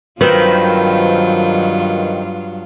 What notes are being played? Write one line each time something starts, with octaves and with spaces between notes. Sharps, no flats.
G2 D#3 F#3 C4 F4 B4